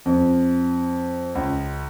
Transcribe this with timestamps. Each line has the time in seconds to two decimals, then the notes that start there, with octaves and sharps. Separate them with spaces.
0.06 F2
1.35 C#2